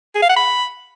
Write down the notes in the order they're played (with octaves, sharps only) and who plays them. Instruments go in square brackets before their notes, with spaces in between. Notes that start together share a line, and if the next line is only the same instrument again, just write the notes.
[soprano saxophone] G#4
F5
F#5
B5